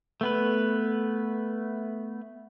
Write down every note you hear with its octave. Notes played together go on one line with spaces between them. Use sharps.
A3 B3 B4